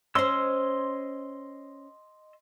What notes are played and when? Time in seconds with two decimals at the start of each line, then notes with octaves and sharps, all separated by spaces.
0.15 C#4 C5 D#5 C6 E6